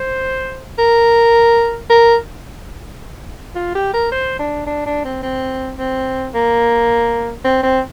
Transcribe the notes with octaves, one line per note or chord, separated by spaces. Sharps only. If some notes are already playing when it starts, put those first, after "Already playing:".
Already playing: C5
A#4
A#4
F4
G4
A#4
C5
D4
D4
D4
C4
C4
C4
A#3
C4
C4